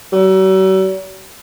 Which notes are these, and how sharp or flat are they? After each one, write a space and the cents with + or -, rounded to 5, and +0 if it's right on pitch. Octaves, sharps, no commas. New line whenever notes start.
F#3 +45